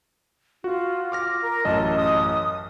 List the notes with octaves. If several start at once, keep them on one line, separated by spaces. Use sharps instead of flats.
F4 F#4
D6 F6 A#6
A#4
A1 F#2 D#5 A5
D#6